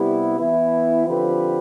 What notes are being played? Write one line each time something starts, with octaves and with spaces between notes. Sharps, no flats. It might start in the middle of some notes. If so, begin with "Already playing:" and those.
Already playing: C3 G3 B3 E4
E3 B3 E4
D3 F3 C4 G4 B4